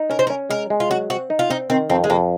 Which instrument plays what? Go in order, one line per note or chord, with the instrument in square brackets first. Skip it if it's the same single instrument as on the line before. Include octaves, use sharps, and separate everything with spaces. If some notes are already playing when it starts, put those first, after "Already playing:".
Already playing: [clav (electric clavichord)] D#4
[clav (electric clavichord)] C#4 [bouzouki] A#4
[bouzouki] C5
A#4
[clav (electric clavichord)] C#4
[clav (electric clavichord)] G#3 [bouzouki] A#4
[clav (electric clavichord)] G#3
[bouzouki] F4
[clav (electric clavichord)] F#3 [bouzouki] F#4
[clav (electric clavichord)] C4 [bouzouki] F#4
[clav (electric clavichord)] D#4
[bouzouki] F4
[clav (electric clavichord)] C4 [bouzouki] D#4
[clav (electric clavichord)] D#3 [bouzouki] C4
[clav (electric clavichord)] F2 [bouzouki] C4
[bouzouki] G#3
[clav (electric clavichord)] F2 [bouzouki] A#3